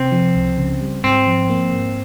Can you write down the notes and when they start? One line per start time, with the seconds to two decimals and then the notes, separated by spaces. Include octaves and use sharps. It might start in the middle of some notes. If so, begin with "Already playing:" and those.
Already playing: C3 C4
0.12 F3
0.36 C#2
0.58 C#3
0.81 G3
1.04 G#2 C4
1.27 F3
1.50 A#3
1.73 G#2